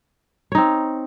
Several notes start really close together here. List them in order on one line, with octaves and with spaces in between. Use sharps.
C#5 D#4 C4